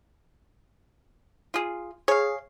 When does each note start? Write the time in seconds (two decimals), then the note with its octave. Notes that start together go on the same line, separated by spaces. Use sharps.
1.54 F4 G#4
2.08 G#4 C#5 F5